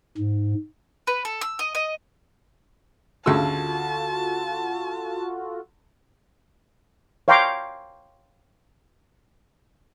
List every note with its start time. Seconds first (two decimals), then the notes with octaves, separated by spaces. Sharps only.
0.18 G#2
1.07 B4
1.25 A4
1.41 E6
1.59 D#5
1.75 D#5
3.26 D2 C#3 F4 F#4 A4 A5 E6
7.28 C#5 F5 G5 A#5 C6 D6